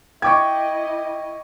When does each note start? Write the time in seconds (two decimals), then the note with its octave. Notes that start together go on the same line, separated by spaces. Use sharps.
0.22 E4 D#5 G5 C#6 D6 G#6